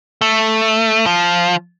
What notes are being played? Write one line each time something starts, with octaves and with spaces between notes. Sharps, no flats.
A3
F3